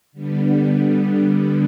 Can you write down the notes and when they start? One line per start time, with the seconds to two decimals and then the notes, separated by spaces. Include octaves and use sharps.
0.12 D3 G3 B3